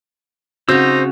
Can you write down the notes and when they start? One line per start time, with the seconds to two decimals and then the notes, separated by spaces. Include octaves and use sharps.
0.69 C#3 C4 D#4 F#4 C5 C#5 E6